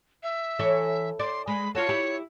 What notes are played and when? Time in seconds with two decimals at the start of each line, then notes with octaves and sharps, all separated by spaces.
0.23 E5
0.59 E3 A4 C#5
1.19 D5 C6
1.47 G#3 B5
1.75 F4 F#4 A4 C#5
1.89 E4 G4